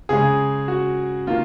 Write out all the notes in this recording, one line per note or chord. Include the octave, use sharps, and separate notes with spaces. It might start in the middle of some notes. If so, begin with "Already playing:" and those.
C#3 G#3 G#4
F#4
D#3 A#3 F4